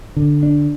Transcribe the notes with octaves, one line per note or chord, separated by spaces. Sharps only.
D3
D4